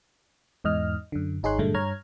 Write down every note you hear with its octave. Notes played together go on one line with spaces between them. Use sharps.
E2 G#2 D#5 F6
F#2 D3
G#1 D#4 G#4 C#5 C6 F#6
G2 A#2 D3 G#3 A3
G2 C#5 A#5 F6 G#6